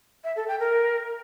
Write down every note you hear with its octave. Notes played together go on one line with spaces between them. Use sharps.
E5
A4
G5
A#4